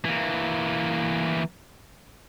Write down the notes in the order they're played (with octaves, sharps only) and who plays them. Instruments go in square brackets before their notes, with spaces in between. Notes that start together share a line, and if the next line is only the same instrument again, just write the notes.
[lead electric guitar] E3 A#3